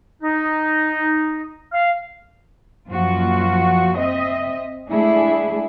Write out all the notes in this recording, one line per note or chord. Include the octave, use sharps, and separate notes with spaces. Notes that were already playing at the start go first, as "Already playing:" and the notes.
D#4
F5
F#2 A#2 F3 F4 F#4
C4 D#5 E5
G#3 A3 D4 E4 G#4